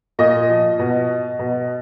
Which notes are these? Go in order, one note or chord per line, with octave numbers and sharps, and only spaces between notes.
A#2 D#5
F3
B2
B2